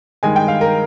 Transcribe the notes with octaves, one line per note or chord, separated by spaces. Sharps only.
G2 D#3 G#3 G#5
G5
F5
A#4